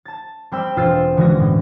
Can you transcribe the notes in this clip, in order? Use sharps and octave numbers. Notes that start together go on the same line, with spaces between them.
A5 A6
G3 C4 G5 B5 C6 E6
E1 F4 C5 E6 A6 C7
D3 E3 G#3 C#4 F#4 A#6
A2